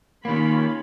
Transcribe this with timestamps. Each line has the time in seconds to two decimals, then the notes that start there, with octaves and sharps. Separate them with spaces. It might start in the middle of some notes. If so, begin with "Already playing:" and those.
0.25 D#3 A#3 C#4 F4 B5